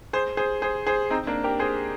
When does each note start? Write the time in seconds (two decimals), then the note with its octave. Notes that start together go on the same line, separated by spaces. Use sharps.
0.13 G#4 C5
0.37 G#4 C5
0.62 G#4 C5
0.87 G#4 C5
1.10 C4 D#4
1.27 A#3 D4
1.44 G4 A#4
1.59 G#4 C5